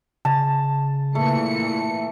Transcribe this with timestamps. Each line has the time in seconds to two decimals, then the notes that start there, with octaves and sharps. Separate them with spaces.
0.25 C#3 A5
1.15 A#2 E3 A3 C#7